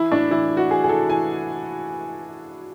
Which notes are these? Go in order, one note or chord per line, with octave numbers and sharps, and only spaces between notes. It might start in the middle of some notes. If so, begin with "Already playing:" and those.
Already playing: E3 E4
A2 D4
E3 E4
E3
F#4
E3 G#4
G#4
E3 A4
E3 G#5